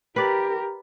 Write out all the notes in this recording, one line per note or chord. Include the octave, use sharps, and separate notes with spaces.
G4 A#4 B4 D5